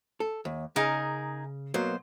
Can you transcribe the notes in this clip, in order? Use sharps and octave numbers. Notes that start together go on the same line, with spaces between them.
A4
D#2
C#3 D#4 G#4 A#4
B2 F#3 A#3 C5